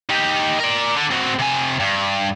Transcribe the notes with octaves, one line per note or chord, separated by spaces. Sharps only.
D#4 G4
A#4 D5
D3
C4 F#4
C3 G#5
G2